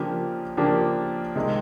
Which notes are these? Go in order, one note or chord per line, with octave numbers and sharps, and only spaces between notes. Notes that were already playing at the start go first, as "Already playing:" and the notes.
Already playing: C#3 F3 A#3 D4 G4
C#3 F3 A#3 D4 G4
C3 D#3 G#3